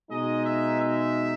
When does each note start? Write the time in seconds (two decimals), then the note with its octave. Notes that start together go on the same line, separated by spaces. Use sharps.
0.11 B2 G#3 D#4 D#5
0.45 E5
0.80 E5